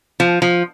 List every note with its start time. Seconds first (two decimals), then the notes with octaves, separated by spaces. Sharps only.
0.20 F3
0.42 F3